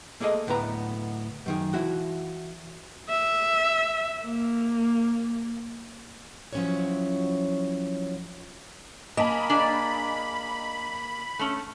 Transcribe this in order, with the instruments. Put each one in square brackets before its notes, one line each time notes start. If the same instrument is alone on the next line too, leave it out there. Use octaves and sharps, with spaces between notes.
[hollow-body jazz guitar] A3 A#3 G#4 A4 D#5
D2 A2 B3 B4 A#5
F#2 D#3 G#4
E3 E4 F#4 F#5
[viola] E5
A#3
[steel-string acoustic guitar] F3 F#3 C#4 E4 F#4 C#5
[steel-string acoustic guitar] A#3 [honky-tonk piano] D#5 G#5 A5 [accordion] B5
[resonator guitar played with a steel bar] D4 G#4 D5
A3 C#4